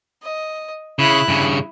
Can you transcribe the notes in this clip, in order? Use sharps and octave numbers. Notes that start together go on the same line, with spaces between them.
D#5
C#3 E4 F#6
G2 C#3